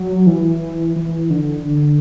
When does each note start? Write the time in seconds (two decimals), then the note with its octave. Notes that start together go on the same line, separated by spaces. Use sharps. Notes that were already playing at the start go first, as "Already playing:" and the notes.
Already playing: F#3
0.27 E3
0.96 E3
1.30 D3